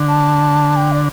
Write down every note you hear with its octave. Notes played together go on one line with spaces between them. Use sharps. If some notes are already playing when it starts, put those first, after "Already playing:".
Already playing: D3
A5
G5
D5